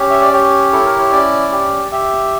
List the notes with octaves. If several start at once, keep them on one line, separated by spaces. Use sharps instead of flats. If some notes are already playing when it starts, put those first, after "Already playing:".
Already playing: C#4 G4 C#5
E5
D5
G4 C#5
E4 A4
A#4
C#5
C#4 D5
G4
G4 E5